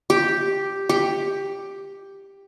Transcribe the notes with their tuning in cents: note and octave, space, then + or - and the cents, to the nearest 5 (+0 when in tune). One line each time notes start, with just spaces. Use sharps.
G4 +0
G4 +5